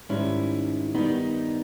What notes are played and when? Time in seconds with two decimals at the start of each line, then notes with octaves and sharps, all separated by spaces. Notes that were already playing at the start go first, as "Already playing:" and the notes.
0.09 G#2 D#3 G3 C#4 E4
0.94 G2 D#3 G3 B3 D#4